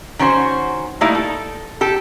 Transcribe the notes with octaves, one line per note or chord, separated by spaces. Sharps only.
D#3 C#4 F#4 C5
G3 A3 A#3 D#4 E4
A4
G4 A4